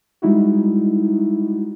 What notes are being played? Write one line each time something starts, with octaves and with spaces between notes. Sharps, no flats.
G3 G#3 D#4 E4 F#4